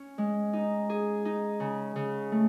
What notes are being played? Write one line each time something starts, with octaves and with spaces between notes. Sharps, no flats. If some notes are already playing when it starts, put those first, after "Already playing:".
Already playing: C#4
G#3
D#4
G#4
D#4
C#3
C#3
A3